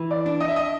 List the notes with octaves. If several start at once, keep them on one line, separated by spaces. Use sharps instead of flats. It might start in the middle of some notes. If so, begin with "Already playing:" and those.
Already playing: E3
D5
D4
D#5
E5
D#5